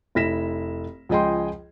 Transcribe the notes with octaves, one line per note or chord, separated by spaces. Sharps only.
F1 E4 A#6 B6 E7
C#2 F3 G#4 D#5 G5 C6